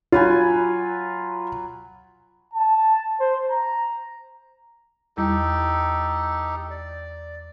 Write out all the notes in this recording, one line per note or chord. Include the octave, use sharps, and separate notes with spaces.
F#3 F4 B4 G#5
A5
C5
A#5
E2 G3 D#4 E4 G4 A4
D5